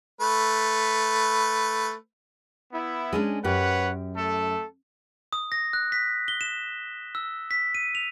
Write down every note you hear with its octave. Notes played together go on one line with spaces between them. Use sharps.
A3 B4
B3 E4
G#3 C#4 D4
F#2 G4 B4 C#5 F#5
A3 A4
D#6
A#6
F#6
B6
G7
E7
E6
B6
D#7
F7